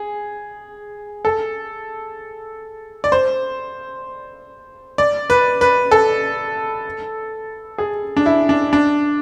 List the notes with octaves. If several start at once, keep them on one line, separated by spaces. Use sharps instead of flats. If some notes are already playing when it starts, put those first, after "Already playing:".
Already playing: G#4
A4
D5
C5
D5
B4
B4
A4
G#4
D4
E4
D4
D4